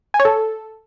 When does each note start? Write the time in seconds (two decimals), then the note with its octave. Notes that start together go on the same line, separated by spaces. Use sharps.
0.14 G#5
0.20 C#5
0.25 A4